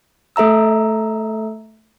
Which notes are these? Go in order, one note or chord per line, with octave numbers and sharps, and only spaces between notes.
A3 A4 E5 A#5 E6